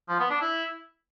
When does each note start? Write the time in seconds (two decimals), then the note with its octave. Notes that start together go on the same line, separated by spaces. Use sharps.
0.09 F3
0.19 B3
0.30 D4
0.41 E4